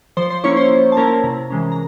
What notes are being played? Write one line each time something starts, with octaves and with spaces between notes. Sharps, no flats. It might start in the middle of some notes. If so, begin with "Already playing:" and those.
F3 C5 C6
C5 C6
A#3 C#4 E4 C#5 C#6
C5 C6
F3
A5
A#3 C#4 E4 A#4 A#5
C3
E3 G#3 C#4
A#5